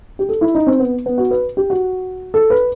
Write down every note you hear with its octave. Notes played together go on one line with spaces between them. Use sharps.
G4
A4
E4
D#4
C4
B3
B3
F#4
B4
G4
F#4
A4
B4